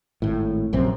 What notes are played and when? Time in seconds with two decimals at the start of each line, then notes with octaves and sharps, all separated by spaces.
0.22 G#1 A2
0.73 A#1 F#2 C3 C4